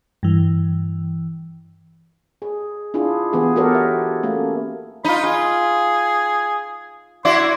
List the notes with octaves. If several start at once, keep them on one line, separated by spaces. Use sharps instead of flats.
G2 E3
G#4
D4 E4 F4 G#4
E3 B3 G4 G#4
B3 F#4 G4 A4 A#4 C#5
E5
A3 A#3 C#4
D#4 F4 B5
F4 G#4
E4 F#4 D5 C6